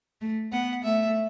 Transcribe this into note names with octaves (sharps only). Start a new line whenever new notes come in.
A3
B3 F#5
A3 E5